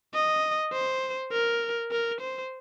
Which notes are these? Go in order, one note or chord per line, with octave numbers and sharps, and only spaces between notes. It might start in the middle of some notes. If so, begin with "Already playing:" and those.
D#5
C5
A#4
A#4
C5